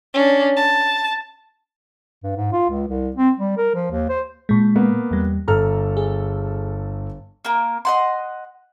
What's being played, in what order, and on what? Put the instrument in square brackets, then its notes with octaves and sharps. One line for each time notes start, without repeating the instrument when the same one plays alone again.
[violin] C#4 D4
A5
[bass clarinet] G2
G#2
F4
C#2
C2
C4
G3
A#4
F3
D#2
C5
[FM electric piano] A#2 G#3
[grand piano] A#3 B3
[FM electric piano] E2 G3
[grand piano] G1 A4 F6 [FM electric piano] A#5
[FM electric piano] G#4
[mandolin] A#3 A#4
D#5 F#5 C6